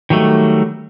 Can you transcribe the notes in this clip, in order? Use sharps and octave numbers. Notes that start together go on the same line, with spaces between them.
D#3 F#3 G3 A3